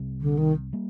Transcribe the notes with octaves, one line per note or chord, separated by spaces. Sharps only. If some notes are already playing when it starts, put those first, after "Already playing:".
Already playing: C2 C3 G3
D3
D#3
G3 A#3